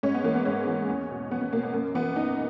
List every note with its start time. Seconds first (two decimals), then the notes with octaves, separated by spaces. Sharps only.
0.03 G#2 C#4
0.14 B3
0.24 E3 A#3
0.35 B3
0.45 G#2 C#4
0.67 E3
0.88 E2
1.09 B2
1.30 E2 B3
1.41 B3
1.52 B2 A#3
1.63 B3
1.73 F#2 A#3
1.94 E3 B3
2.16 F#2 D#4